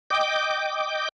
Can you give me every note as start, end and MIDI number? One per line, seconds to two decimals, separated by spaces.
0.10 1.09 75
0.10 1.09 79
0.10 1.09 86